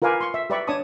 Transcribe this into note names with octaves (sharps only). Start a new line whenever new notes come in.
F4 A#4 B4 F5 G#5 D6
C6 C#6
E5
G4 B4 D5 E5 B5 C#6
D4 C#5 D5 A5 C#6 D#6